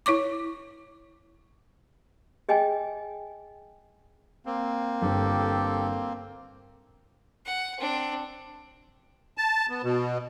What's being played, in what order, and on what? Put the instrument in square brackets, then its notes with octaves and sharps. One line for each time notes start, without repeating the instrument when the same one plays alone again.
[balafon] E4 C#5 C#6 D6
[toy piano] G#4 D#5 G5 G#5
[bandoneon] A#3 C4
[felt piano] G1 [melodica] G4 A4
[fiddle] F#5
C4 D4
[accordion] A5
B3
B2